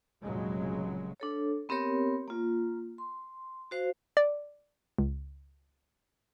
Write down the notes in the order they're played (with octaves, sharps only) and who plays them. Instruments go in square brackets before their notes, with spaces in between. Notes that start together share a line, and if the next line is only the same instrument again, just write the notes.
[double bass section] F1 A#2 C#3 F#3 G#3
[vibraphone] D4 A4 C#5
B3 C4 G4 A#4 C#5
A#3 F4
C6
F#4 C5 F5
[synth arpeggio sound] D5
C#2